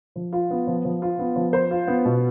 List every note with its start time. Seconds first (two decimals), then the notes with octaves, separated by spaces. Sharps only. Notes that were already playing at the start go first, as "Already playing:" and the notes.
0.16 F3
0.33 F4
0.50 B3
0.67 F3
0.85 F3
1.02 F4
1.19 B3
1.36 F3
1.53 C5
1.71 F4
1.87 B3
2.05 B2